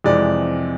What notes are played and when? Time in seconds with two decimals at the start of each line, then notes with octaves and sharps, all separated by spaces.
0.04 F2 C3 E3 G#3 D5